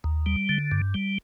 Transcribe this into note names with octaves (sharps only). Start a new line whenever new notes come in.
D#2
G3
D3
G2
G3